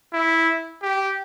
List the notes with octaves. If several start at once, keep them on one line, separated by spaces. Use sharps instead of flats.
E4
G4